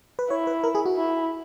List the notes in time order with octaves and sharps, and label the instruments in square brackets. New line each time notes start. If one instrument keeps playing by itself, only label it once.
[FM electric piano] B4
[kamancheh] E4 [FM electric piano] C#5
[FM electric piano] B4
A#4
G#4
F#4
[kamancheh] E4